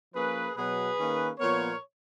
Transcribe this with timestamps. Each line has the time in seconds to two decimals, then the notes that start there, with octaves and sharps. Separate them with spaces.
0.14 F3 A#3 C#4 G#4 B4
0.56 B2 F#3 B3 G#4 B4
0.98 D#3 A#3 C#4
1.39 A#2 F3 B3 A#4 C#5